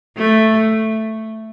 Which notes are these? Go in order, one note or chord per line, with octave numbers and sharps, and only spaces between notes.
A3